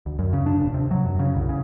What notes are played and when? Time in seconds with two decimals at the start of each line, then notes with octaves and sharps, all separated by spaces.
0.06 D2
0.19 F#2
0.33 C#3
0.46 D4
0.60 D#1
0.74 C3
0.91 F#3
1.04 F#2
1.19 C#3
1.36 C2
1.49 C#3